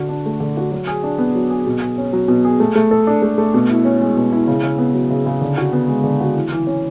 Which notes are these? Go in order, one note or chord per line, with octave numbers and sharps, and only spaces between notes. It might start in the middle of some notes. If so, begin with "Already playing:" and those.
Already playing: D3 F#4
D4
A3
D3
F#4
F#3
G#4
D4
B3
F#3
G#4
B2
G#4
C#4
F#3
B2
G#4
A3
A3
A4
D4
A3
A3
B2
E4
C#4
G#3
B2
E4
C#3
C#3
B3
F#3
C#3
C#3
D3
F#4
B3
G#3
D3
F#4
E3
E3
C#4